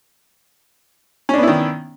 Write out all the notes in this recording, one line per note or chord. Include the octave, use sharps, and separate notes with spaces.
D#3 B3 C#4 D4 E4